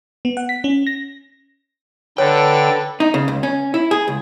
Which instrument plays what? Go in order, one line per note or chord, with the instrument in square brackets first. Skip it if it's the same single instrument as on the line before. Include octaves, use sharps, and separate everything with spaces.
[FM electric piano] B3
F#5
B6
C#4
A#6
[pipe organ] D3 [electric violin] A4 B4 [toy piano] C#5 [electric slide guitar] G5
[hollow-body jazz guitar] D#4
C#3
C#2
C#4
E4
G#4
C#2